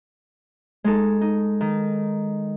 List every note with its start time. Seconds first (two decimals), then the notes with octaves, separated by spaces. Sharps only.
0.84 G#3 D#4 A4
1.21 D#4
1.61 D#3